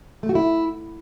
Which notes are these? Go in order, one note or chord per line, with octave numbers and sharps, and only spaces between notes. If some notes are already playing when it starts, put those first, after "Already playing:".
A3
F#4
E4